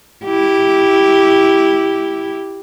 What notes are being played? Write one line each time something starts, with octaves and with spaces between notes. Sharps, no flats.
E4 G4